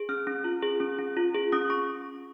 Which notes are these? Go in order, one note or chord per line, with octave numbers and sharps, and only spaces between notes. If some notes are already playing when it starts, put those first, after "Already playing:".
Already playing: G#4
C#4 F6
C#4
F4
G#4
C#4
C#4
F4
G#4
C#4 D#6
C#4 C#6